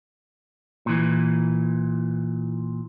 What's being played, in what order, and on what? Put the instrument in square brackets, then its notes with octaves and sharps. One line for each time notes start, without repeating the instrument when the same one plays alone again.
[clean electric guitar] A#2 E3